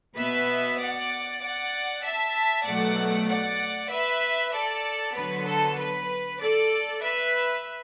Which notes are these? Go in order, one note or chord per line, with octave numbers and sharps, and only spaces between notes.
B2 B3 B4 E5
D5 F#5
D5 F#5
E5 A5
B2 F#3 A3 D5 F#5
D5 F#5
B4 E5
A4 D5
D3 F#3 B3 B4
A4
B4
A4 D5
B4 E5